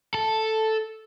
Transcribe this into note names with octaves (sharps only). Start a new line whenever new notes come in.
A4